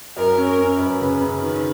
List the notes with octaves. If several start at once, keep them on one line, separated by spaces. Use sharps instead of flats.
F#2 A#4
C#4
A#4
C#4
F#2 B4
C#3
C#3
D#3 B4